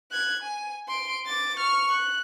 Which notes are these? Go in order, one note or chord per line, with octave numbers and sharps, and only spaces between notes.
F#6 G#6
G#5
C6 D7
D6 A6
C#6 F6
F#6